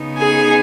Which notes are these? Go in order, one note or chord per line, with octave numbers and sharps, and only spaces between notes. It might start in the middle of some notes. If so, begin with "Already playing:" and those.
Already playing: C#3 B3 D#4
G#4 G#5